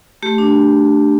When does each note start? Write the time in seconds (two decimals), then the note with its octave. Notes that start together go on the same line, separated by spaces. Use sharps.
0.22 A3 G4
0.38 D4